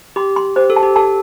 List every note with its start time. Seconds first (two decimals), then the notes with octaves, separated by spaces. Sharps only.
0.16 G4 C6
0.36 C6
0.56 G4 C5
0.70 A4
0.76 A5
0.83 G4
0.96 A4 A5